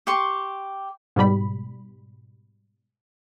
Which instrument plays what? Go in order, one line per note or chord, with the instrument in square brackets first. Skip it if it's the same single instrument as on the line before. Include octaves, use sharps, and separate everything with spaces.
[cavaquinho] G4 C6 C#6
[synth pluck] G#2 B2 G3 B5